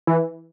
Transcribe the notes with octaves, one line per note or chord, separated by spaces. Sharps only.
E3